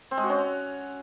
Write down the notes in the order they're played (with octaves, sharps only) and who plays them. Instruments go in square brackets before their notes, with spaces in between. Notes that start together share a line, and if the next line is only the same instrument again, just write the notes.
[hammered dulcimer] C4
G#3
F#4
C#4